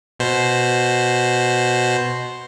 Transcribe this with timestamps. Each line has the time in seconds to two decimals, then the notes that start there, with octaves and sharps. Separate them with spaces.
0.20 B2 C5